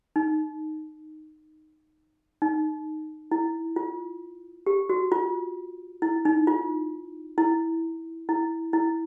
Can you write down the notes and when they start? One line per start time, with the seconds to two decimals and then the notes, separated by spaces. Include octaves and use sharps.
0.16 D#4
2.42 D#4
3.31 E4
3.76 F4
4.66 G4
4.89 F#4
5.12 F4
6.02 E4
6.25 D#4
6.47 F4
7.38 E4
8.29 E4
8.73 E4